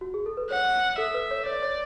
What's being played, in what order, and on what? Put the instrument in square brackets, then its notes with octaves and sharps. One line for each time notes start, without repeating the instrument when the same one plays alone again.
[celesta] F#4
G#4
A4
B4
[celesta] C#5 [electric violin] F#5
[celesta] A4 [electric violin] E5
[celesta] B4
C#5
[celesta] C#5 [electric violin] D5
[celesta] C#5